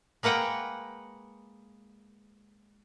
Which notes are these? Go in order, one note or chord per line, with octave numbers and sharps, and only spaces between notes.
G#3 A#3 B4 F#5 G5